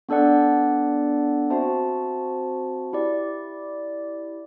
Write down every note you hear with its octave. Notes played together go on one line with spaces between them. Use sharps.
B3 D4 A4 D5 F#5
C4 F#4 C5 E5 A5
E4 G4 D5